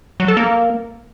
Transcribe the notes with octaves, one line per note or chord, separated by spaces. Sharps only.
F#3
A4
A#3